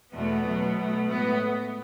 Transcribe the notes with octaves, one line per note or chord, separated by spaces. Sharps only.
E2 B2 A3 B3
B2 F#3 A3
B2 A3
A2 G#3 B3